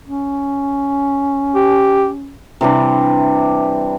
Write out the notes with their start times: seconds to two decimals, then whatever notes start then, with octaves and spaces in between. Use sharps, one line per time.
0.05 C#4
1.55 G4
2.61 C3 E3 G3 D4